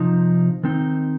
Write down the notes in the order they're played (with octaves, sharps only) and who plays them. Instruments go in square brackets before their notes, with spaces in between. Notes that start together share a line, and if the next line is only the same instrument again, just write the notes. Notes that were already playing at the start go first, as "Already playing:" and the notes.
Already playing: [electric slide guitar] C3 F3 D#4
D#3 C4 D#4